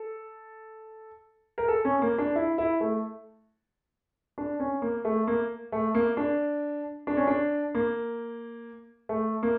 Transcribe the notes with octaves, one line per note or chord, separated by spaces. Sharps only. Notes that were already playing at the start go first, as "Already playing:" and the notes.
Already playing: A4
A#4
A4
C#4
A#3
D4
E4
E4
A3
D4
C#4
A#3
A3
A#3
A3
A#3
D4
D4
C#4
D4
A#3
A3
A#3